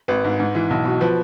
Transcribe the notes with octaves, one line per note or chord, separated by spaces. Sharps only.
G#1 B4
G#2
G#2
E3
B1
B2
F3 B4